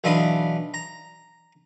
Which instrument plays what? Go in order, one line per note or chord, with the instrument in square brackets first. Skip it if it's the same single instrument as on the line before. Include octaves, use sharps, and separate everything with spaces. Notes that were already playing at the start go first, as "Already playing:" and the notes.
[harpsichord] B1 E3 D4 F4 D#5 B5
A#5